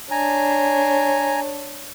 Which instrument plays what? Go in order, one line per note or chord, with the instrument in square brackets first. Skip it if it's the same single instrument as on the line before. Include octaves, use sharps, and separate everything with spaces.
[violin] D4 C#5 [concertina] G#5 A#5